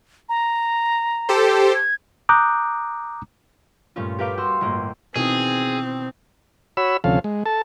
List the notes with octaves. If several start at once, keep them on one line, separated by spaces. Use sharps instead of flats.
A#5
G4 A4 C5
G#6
A#5 D6 D#6 F#6 G6
G2 A#2 A3 C#4 F4
G4 A#4 B4 F5 G5 D6
F#4 F5 G5 C6 C#6 E6
G1 A2 A#3 G6
B2 D#3 E3 C4 G#4
F#4 C#5 B5 E6
D2 C3 F3 C#4 A4 F5
G#3
A4 A5